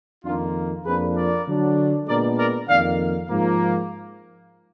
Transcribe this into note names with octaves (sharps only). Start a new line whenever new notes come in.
F2 D#3 A#3 D4 F4
F2 F3 A#3 D4 G#4 B4
A#4 D5
D3 F#3 D4
A#2 G#3 B3 D4 A#4 D5
A#4 D5
F2 D#3 A#3 D5 F5
G#2 F3 A#3